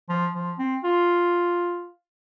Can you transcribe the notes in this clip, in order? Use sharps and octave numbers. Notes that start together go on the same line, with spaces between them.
F3
F3
C4
F4